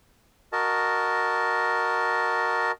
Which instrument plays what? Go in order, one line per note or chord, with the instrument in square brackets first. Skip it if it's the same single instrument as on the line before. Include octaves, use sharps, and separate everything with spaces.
[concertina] F#4 A#4 D#5 A5